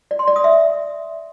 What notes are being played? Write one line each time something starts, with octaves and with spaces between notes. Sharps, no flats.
D5
C6
D5
D#6
E5